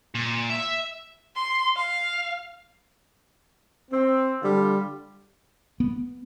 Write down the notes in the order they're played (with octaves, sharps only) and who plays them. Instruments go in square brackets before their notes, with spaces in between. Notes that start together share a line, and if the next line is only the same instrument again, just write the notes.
[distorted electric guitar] A#2
E5
[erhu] C6
F5
[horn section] C4
D3 G3 F4
[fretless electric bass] B3